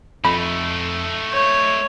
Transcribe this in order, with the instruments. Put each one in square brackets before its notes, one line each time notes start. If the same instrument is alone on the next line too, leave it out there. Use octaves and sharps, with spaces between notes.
[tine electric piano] F2 [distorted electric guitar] A3 D#4 [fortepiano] B5
[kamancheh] C#5 [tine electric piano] G6